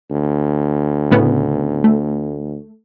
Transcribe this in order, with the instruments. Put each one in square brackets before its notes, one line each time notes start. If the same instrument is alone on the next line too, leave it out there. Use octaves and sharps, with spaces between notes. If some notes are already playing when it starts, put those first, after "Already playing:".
[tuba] D2
[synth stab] A2 C#3 B3
A3